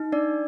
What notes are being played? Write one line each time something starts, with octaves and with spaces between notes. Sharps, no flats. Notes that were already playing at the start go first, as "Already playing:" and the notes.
Already playing: D#4
D4 D5